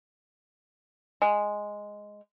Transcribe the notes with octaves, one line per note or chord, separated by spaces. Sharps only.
G#3